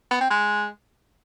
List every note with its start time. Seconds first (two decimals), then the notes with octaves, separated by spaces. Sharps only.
0.11 B3
0.21 C4
0.30 G#3